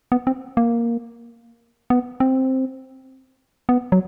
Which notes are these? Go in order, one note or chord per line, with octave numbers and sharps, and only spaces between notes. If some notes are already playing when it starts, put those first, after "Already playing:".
B3
C4
A#3
B3
C4
B3
F#3